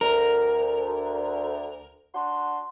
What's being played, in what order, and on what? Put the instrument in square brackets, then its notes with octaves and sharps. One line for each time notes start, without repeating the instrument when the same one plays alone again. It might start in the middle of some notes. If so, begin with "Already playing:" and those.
[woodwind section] D2 [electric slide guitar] A#4
[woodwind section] D4 F#4 C6